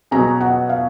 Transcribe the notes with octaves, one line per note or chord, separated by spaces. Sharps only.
B2 F#3 C#4 G#4 A#5
F#5
F5